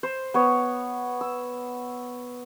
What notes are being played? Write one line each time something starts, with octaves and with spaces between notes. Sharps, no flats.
C5
B3 C#5
E6